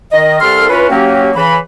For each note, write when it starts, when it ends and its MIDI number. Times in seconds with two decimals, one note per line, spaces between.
0.12 0.40 51
0.12 0.40 75
0.41 0.70 36
0.41 0.70 69
0.41 0.70 84
0.41 0.70 89
0.70 0.86 52
0.70 0.86 61
0.70 0.86 65
0.70 0.86 66
0.70 0.86 71
0.90 1.31 54
0.90 1.31 58
0.90 1.31 61
0.90 1.31 67
1.35 1.56 49
1.35 1.56 52
1.35 1.56 83